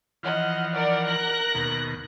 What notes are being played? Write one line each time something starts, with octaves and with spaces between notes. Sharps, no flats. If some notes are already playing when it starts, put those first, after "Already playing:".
E3 F3 D#5 F#5 F6
A#4 D5 F#5
F#6 A#6
D#2 B2